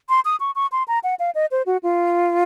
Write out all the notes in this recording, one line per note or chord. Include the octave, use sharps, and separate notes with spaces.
C6
D#6
C#6
C#6
C6
A#5
F#5
F5
D#5
C5
F#4
F4